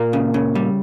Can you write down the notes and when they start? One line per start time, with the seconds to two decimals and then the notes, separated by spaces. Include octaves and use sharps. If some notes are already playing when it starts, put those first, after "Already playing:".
Already playing: A#2 A#3
0.13 C#3
0.34 C#3
0.55 G3